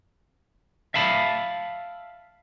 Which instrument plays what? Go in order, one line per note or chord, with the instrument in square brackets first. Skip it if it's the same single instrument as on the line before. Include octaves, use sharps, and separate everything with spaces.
[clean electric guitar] E5 F5 A5 B5